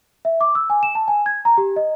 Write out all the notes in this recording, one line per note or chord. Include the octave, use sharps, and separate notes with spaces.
E5
D6
E6
G#5
E7
A5
G#5
G#6
A#5
G4
D#5